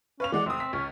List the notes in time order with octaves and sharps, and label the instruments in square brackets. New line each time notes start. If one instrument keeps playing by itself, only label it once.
[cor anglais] C#4 [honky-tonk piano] B4 F5 F7
[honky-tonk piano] E3 G#3 F#5 [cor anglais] D5
[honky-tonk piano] F1 D#6 [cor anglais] C4
[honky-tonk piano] B6
[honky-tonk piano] C#2 [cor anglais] C#4